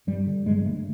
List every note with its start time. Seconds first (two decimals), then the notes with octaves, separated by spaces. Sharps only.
0.07 G2 G3
0.27 D3
0.46 G2 G#3
0.59 G#3
0.65 D3 A3